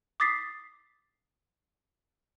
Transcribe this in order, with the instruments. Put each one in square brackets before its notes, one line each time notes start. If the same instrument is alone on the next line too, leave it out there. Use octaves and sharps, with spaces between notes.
[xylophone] D6 D#6 A6 B6 C7